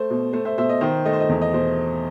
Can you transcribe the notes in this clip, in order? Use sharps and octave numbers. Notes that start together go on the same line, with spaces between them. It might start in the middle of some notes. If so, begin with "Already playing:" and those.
Already playing: A3 C5
B2
A3 C5
C5 E5
B2 C5 E5
D#5
D#3 C5
A3 D#5
C5
D#5
E2 C5
D#5
B2 C5